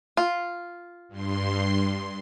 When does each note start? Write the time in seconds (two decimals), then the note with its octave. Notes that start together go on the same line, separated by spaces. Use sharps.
0.17 F4
1.09 G2 C6